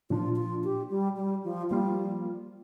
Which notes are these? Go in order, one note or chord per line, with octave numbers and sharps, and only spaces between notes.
A#2 F3 D4 F4
F4
G4
G3
G3
F3
F3 G3 A#3 F4